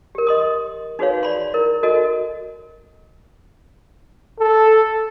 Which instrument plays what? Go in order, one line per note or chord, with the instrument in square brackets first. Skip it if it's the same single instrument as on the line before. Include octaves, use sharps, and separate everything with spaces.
[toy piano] G4 A#4
D#5 C6 D#6
D#4 F#4 G#4 B4 C#5 F5
D5 B5 C6
E4 A#4
D#4 F#4 A4 A#4 D#5
[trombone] A4